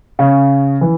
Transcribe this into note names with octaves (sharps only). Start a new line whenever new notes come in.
C#3
E3